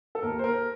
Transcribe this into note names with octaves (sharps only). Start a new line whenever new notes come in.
A4
D#2 A#4
C5
A#4